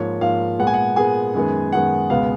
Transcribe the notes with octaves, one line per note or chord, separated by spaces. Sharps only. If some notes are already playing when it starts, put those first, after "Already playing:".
Already playing: G#2 F3 A#3 C#5
G#2 F3 A#3 F5
A#2 G#3 B3 F#5
G#5
F#5
A#2 G#3 B3 G#4 G#5
F#2 D#3 G#3 B3
F#2 D#3 G#3 B3 F#5
C#2 B2 G#3 B3 F5